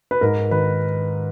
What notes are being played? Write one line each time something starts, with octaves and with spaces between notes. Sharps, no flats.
B4
G#2 A#4
D#3 B4